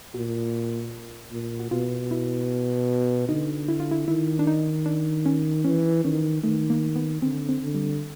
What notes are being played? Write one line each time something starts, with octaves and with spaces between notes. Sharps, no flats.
A#2 F#4
A#2
F#4
B2 F4
E4
D3 D#4
E4
F4
E4
D#3 E4
D4
D#4
D4
C#4
E3 C#4
D#3 C#4
D#3 A3
A#3
B3
D3 C4
C4
D3
G3